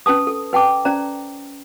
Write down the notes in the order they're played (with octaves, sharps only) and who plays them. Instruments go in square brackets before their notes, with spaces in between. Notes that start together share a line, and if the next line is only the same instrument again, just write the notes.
[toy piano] C#4 B4 A5 D#6
A4
B4 G5 A5 D6
C#4 C5 D5 A#5